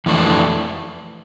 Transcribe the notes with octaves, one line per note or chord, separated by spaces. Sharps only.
F2 E3 A3 D4